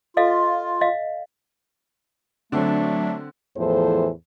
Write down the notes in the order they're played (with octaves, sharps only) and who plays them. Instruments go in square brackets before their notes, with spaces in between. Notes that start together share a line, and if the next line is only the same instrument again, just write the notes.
[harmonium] F4 [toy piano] A4 D#5 F5
[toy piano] D#5 F5
[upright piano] D3 C4 [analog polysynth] F#3 D4 [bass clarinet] A3
[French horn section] E2 A2 E3 F3 A4 C5